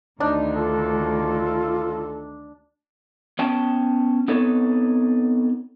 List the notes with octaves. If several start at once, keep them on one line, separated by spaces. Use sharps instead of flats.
D2 D#3 D4 D#4
F4 A4
B3 C#4 G5 A5
B3 C4 D#4 A4 B4 C#5